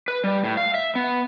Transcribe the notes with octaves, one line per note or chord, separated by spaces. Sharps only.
B4
G3
A2
F5
E5
B3